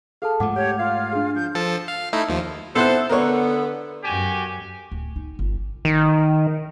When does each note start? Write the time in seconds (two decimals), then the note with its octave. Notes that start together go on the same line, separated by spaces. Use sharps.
0.22 G#4 A4 F5 A5
0.40 G#2 F3 G#3 A3 F#5 D6
0.56 G4 C#5
0.79 F4 F5
1.13 D4 G#4
1.35 F3 G6
1.55 F3 A4 A5
1.88 F5
2.13 A3 D#4 E4
2.29 D#2 F3
2.76 B3 E4 A4 C5 F#6
3.09 D3 B3 A#4 C#5
4.04 F#2 F#4 G4 G#5
4.92 D1
5.16 D#4
5.39 G1
5.85 D#3